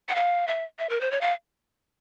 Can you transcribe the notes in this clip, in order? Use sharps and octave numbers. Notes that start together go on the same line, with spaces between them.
F#5
F5
E5
E5
A#4
C5
C#5
F5